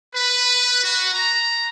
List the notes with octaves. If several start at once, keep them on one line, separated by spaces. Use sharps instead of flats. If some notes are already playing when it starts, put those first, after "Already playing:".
B4
F#4
A#5